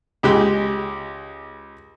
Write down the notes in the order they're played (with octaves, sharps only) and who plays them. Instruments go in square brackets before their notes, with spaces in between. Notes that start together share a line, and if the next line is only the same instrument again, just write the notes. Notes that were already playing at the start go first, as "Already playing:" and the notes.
[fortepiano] C#2 G#3 G4